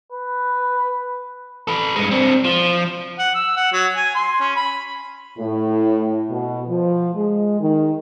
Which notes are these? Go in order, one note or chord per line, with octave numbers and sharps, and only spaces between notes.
B4
A4 B4
G2 G#3
C4 D4
F3
F#5
E6
F#5
F#3
G#5
C6
C#4
B5
A2
B2
F3
G#3
D#3